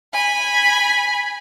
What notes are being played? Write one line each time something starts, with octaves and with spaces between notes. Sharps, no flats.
G#5 B5